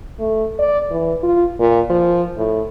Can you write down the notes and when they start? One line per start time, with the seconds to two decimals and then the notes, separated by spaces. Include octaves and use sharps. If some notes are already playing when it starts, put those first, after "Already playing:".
0.19 A3
0.59 D5
0.90 E3
1.23 F4
1.59 A#2
1.89 F3
2.37 A2